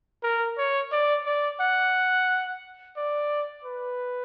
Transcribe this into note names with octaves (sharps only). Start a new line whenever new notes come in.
A#4
C#5
D5
D5
F#5
D5
B4